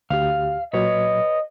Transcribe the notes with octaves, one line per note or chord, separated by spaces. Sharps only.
D2 G4 F5
A#2 F#3 B4 C#5 D#5